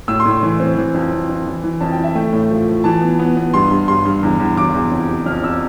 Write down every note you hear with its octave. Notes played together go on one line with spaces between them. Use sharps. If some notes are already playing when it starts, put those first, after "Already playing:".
A2 E6
C6
A2
C6
E3
C4
E3
F2
F2
F2
E3
E3
F2 A5
G5
E3
E5
A3 G5
A2
F3
F3
E3 A5
B3
B3
B3
G2 C6
G2
G2 C6
G2
E2
E2
E2 D6
E2
F2
C3
F2 F6
F2 E6